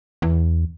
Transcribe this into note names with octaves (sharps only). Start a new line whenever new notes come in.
E2